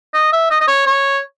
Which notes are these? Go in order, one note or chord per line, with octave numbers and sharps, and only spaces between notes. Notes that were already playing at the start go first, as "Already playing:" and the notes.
D#5
E5
D#5
D#5
C#5
C#5